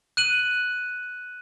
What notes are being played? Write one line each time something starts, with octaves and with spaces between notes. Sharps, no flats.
F#6 D#7 F#7